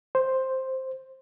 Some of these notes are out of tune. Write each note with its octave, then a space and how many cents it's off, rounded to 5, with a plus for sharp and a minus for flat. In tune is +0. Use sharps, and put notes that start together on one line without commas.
C5 +5